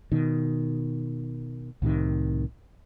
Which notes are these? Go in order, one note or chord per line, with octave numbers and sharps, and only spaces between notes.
B2 D#3
C2 A2 C3 D#3